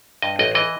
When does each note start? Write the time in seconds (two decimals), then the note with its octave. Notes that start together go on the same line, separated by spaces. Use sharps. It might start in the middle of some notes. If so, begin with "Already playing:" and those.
0.22 G2 D#5
0.39 A1 D#5
0.55 E3 D#5